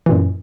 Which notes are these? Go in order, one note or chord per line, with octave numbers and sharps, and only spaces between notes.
F#2 A#2 E3